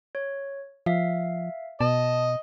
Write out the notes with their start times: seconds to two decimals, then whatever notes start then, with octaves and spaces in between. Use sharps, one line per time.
0.15 C#5
0.86 F3 E5 F5
1.81 B2 D#5 A5